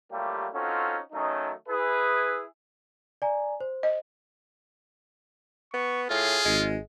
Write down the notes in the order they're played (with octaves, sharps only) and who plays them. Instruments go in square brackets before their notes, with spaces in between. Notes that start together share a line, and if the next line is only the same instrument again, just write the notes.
[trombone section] F#3 G3 A3 A#3 F4 G4
C4 C#4 D#4 F4 F#4 A4
D#3 F#3 A3 C#4 D#4
E4 G#4 B4
[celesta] D5 G#5 A#5
C5
[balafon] D#5
[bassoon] B3 [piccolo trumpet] C#6
[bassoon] A2 [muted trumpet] F4 [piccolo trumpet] G#4
[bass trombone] G#1 [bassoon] G#3